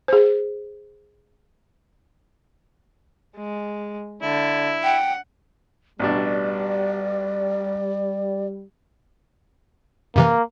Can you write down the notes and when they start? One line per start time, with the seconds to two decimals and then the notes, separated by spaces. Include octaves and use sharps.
0.08 G#4 C5
3.36 G#3
4.22 D3 E4
4.84 F#5 G5
5.99 A1 B2 G3 D4 D5
10.16 F#2 C3 E3 A#3